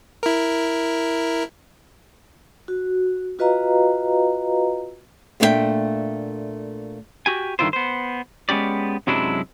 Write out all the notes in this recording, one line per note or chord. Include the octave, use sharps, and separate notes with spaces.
E4 A#4
F#4
F4 F#4 B4 D#5 F5 A#5
A#2 A3 D4 E4 E5 G5
F#4 G4 G#5
G2 D3 D#3 E4 F4 C5
B3 C5
G#3 B3 C#4 G4 D5
F#2 C3 F#3 G#3 D4 E4